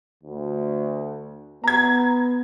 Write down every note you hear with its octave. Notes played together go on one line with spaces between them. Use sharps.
D2
B3 A#5 G#6